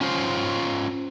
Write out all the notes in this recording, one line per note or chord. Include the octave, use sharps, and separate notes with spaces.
C#4 F4 C5